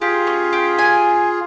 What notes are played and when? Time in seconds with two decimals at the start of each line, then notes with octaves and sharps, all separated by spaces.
0.01 F4 G4 G#4
0.27 C#4
0.53 G4
0.78 G#5